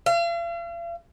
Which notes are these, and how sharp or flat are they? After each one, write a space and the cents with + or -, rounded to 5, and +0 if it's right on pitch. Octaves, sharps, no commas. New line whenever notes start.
F5 -45